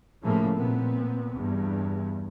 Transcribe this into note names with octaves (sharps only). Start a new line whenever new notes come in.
A2 C#3 F3 A3 A#3
A#2 B3 C4
E2 G2